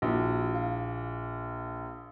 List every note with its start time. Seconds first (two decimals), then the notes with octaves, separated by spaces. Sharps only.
0.02 A#1 E4 F#4
0.55 F5